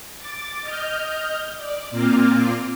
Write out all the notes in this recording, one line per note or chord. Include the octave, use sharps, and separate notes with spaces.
D6 A6
D#5 F6 G6
D5
A#2 A#3 C4 F4 D6 F6